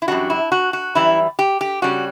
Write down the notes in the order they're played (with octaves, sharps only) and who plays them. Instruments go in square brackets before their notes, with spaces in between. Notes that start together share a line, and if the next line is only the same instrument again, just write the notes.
[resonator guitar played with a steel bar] E4
F#2 E3 G3 D4 F#4
E4
F#4
F#4
F#2 E3 G3 E4
G4
G4
C#3 G3 C#4 F#4